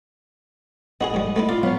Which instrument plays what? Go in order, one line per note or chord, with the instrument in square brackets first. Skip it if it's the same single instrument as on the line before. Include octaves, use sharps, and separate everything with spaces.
[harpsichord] B3 F#4 G#4 [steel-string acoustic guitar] D#5
[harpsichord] G#2 G3
A3 B3 E4
[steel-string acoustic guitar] F4 [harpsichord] D5
[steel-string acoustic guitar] F#3 B3 F5